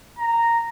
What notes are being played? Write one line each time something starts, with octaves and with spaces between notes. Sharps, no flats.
A#5